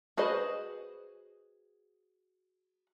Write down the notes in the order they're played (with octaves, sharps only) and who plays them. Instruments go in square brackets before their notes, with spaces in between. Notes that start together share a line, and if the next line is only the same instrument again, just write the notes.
[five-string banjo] F#4 G#4 B4 C5 D#5